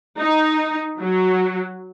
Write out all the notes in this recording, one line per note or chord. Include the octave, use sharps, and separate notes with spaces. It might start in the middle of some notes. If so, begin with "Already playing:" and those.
D#4
F#3